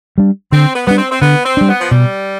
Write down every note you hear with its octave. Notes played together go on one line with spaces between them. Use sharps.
G3 D4
D3 C4
B3
G3 B3 D4
C4
C4
D3 B3
C4
G3 D4
B3
F3
B2 G3